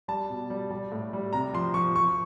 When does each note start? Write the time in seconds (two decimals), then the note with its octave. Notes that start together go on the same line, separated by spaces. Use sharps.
0.08 G3 A5
0.30 B2
0.50 G3
0.70 G3
0.92 A2
1.13 G3
1.33 C3 A#5
1.53 F3 C6
1.74 F3 C#6
1.96 F3 C#6